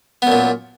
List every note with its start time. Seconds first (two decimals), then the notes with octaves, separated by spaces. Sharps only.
0.22 B3
0.27 F#2
0.32 A#2